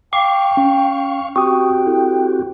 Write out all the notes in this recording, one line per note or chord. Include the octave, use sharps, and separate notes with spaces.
F5 G5 C#6 D6
C#4
C4 F#4 G4 G5 C#6 D#6
E4 A4